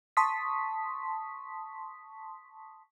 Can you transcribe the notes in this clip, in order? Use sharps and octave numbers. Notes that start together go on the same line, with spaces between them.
A5 C6 C#6 D#6 B6